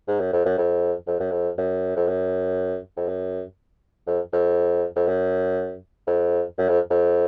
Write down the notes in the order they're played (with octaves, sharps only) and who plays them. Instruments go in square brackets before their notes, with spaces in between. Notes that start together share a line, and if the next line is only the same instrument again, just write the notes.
[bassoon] G#2
F#2
F2
F#2
F2
F2
F#2
F2
F#2
F2
F#2
F2
F#2
F2
F2
F2
F#2
F2
F#2
F2
F2